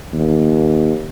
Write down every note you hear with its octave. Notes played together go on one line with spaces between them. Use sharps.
D#2